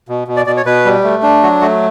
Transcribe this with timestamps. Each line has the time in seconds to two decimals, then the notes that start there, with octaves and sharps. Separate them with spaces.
0.08 B2
0.28 B2
0.37 D5
0.47 B2 D5
0.57 C#5
0.66 B2 B4
0.85 G3
1.04 A3
1.23 D4
1.43 F#3 F#4
1.61 A3 F#4